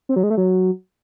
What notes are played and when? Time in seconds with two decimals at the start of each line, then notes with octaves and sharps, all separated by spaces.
0.09 C4
0.16 F#3
0.23 G#3
0.30 A3
0.37 F#3